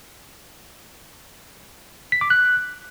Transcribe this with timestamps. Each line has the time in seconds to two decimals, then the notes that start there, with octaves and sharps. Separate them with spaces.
2.12 B6
2.21 D6
2.30 F#6